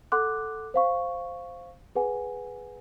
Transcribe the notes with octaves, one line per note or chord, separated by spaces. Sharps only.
A4 F#5 C6 D6 F#6
C5 F5 C#6
G#4 B4 F#5 G#5